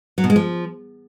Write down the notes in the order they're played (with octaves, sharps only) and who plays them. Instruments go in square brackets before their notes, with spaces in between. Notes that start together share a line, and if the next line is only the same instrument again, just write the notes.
[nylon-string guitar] F#3
B2
G#3
F3